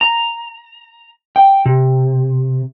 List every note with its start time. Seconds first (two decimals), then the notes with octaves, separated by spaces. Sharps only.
0.01 A#5
1.36 G5
1.66 C3